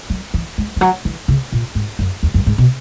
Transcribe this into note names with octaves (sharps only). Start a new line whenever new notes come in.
F#3
E3
G#3
E3
F#3
E3
C#3
A#2
G#2
F#2
E2
F#2
G#2
B2